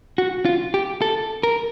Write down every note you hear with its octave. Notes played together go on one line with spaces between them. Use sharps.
F#4
F4
G4
A4
A#4